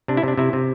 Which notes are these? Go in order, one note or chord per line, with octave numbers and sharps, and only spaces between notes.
C3 D4
E4
C3 D4
C3 E4
C3